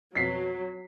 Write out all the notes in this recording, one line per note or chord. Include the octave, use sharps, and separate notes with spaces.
F2 B2 F#3 B6 C7